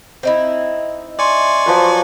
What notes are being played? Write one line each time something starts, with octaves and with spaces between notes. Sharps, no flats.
C4 D#4 E4
D5 G#5 C6 C#6
F3 F#3 B4